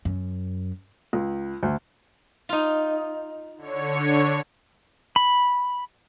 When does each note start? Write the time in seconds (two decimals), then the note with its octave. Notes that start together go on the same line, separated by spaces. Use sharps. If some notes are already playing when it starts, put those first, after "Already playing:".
0.05 F#2
1.13 C#2
1.63 D2
2.49 D#4 F4
3.57 D3 C#5 C#7
5.16 B5